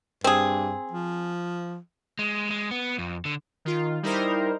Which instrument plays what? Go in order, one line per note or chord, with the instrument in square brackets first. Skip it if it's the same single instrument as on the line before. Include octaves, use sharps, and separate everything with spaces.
[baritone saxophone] G2 [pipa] C4 G#4
[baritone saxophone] F3
[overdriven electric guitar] G#3
G#3
B3
F2
D3
[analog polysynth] D#3 F4
G3 D#4 E4 A#4 C5